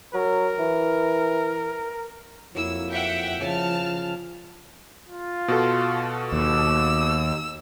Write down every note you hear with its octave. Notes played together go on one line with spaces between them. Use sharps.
F#3 A#4
E3
F2 F#3 A#3 E4 E6
E5 F#5 G5
C#3 F3 G#5 A5 F6
F4
B2 F#4 A4
D#2 D6 E6